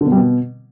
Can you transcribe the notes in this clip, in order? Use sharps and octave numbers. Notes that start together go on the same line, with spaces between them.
D3
B2
G3
B2